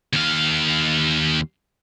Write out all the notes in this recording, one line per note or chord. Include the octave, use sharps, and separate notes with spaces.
D#2 F5